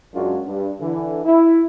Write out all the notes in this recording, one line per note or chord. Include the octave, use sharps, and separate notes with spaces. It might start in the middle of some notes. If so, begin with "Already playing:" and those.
F#2 G#3 C#4 D4 F4 F#4
G2
D3 E3
E4